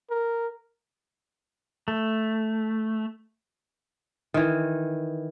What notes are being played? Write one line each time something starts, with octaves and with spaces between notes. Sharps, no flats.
A#4
A3
D#3 E3